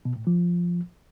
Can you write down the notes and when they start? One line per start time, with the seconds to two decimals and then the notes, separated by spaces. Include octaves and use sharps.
0.05 B2
0.16 A2
0.27 F3